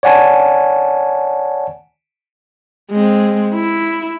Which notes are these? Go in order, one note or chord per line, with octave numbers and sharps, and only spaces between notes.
C#5 D5 F#5 G#5 A5
G#3 C4
E4